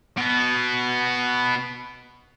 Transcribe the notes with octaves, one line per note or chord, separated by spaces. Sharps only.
B2 B3